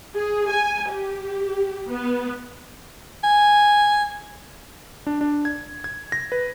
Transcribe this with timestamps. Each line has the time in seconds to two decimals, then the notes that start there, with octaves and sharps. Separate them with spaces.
0.16 G#4
0.50 G#5
0.92 G4
1.91 B3
3.24 G#5
5.07 D4
5.21 D4
5.45 G#6
5.84 G#6
6.12 A#6
6.32 B4